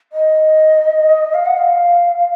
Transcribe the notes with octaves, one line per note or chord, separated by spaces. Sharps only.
D#5
F5
F#5
F5